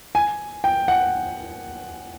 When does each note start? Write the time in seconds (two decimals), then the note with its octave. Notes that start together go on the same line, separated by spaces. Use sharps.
0.15 G#5
0.64 G5
0.88 F#5